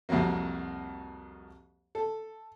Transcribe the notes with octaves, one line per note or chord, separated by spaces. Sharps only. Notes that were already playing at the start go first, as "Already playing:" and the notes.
C2 F2 C3 F#3 A#3
A4